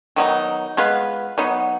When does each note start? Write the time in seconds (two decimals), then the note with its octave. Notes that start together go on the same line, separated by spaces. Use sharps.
0.16 D#3 F#3 B3 D#4
0.77 G#3 B3 F4 B4
1.38 F#3 B3 D#4